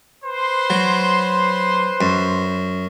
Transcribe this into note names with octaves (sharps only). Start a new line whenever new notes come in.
B4 C5 C6
F#3
F#2